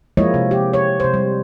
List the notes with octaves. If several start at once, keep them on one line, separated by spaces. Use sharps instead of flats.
F3 G#3 A#3 E4 C#5 D#5
C3
G4
C#5
C3 C5
G3